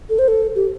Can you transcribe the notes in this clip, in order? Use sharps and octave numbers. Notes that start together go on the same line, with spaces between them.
A4
C5
A4
G4